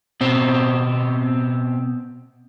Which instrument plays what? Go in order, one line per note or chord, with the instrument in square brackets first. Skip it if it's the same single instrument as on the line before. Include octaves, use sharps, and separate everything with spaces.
[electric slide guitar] B2 C4